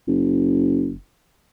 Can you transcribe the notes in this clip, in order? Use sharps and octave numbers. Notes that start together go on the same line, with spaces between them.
F#1